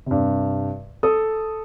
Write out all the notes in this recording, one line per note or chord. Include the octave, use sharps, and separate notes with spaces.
G2 C3
A4 D#6